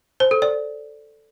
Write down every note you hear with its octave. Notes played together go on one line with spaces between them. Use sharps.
C5
A4
D5